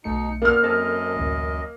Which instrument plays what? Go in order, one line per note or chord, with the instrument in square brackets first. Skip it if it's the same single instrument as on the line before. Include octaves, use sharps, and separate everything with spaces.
[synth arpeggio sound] B1 A3 C#7 [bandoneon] B2 D#4
[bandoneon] A#2 B3 [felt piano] A#3 F6
[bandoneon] F#2 D#5 [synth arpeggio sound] C4 A4
[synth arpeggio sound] A1 D2